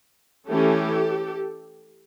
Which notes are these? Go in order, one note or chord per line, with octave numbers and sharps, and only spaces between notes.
E3 A3 C#4 E4 G4 A4